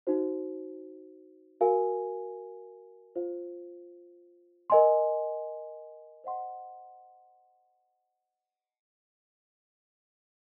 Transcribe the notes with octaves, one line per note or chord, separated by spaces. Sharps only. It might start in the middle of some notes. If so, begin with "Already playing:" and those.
D#4 F#4 C5
F#4 A#4 F5 G#5
F4 C5 F5
A#4 D#5 G#5 C6
C5 D#5 F#5 C6